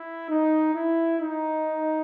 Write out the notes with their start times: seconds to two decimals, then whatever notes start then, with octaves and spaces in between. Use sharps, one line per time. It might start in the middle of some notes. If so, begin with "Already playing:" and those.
Already playing: E4
0.29 D#4
0.74 E4
1.19 D#4